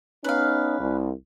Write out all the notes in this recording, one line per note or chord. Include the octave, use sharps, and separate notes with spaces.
B3 C#4 D#4 B4 F5
C2